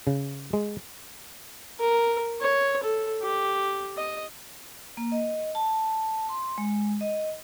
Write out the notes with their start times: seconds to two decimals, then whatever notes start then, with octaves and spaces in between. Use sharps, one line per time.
0.07 C#3
0.53 G#3
1.80 A#4
2.41 C#5
2.83 A4
3.22 G4
3.97 D#5
4.97 A#3
5.12 D#5
5.55 A5
6.29 C6
6.58 G#3
7.01 D#5